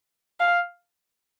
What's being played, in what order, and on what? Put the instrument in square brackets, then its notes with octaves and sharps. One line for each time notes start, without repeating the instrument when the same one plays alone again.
[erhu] F5